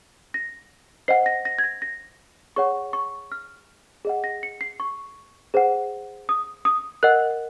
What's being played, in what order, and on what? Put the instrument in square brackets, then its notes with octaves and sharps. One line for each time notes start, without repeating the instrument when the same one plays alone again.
[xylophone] A#6
C5 D#5 F#5 C7
A#6
A#6
G#6
A#6
A#6
G#4 C#5 F#5 C#6
C#6
F6
G#4 D#5 F#5
A#6
C#7
C7
C#6
G#4 C5 F#5
D#6
D#6
A#4 D#5 F#5 F#6